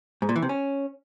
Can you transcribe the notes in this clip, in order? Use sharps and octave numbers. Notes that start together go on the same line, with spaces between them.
G#2
A#2
E3
C3
C#4